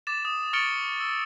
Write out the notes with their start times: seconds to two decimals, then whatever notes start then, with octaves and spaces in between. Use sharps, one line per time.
0.07 D6 A6 E7
0.25 D#6
0.53 C#6 F6 A6 C#7 D7 G7
1.00 E6